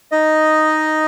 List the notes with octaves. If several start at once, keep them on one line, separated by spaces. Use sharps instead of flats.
D#4 D#5